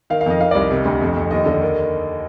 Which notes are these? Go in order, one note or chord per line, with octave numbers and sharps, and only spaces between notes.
D#3 F5
F5
F2 D#5
D#3 F5
D5
C2
D#5
C3
D2
F2
F2
D#2 D#5
D3 D#5
D#3